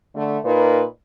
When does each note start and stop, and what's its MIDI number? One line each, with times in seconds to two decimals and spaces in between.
0.15 0.37 50
0.15 0.37 57
0.45 0.83 46
0.45 0.83 63
0.45 0.83 70
0.45 0.83 71